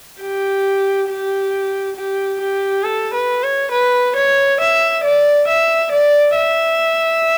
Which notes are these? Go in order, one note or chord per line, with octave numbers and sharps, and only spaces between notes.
G4
G4
G4
G4
A4
B4
C#5
B4
C#5
E5
D5
E5
D5
E5